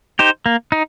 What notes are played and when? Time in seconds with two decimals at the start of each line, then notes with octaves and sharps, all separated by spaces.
0.19 D#4 G4 C5
0.46 A#3
0.72 D#4